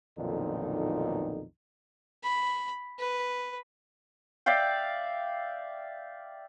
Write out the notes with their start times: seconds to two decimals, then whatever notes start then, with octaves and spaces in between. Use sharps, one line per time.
0.18 B1 F2 A#2 D3 D#3 D#4
2.24 B5
2.99 B4
4.46 D5 E5 F5 G5